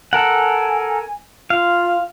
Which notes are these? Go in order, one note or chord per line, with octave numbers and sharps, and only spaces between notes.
A4 A#4 F#5 G#5
F4 F5